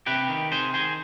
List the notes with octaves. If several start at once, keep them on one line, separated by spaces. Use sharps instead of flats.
C3 G4 B4
D#3
C3 G#4 C5
D#3 G#4 C5